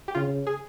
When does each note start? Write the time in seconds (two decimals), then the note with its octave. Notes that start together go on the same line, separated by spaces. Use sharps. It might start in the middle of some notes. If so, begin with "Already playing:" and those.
0.08 G4
0.15 C#3 F4
0.47 G#4